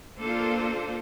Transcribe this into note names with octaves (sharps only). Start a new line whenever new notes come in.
A#3 D4 F4 A4 C5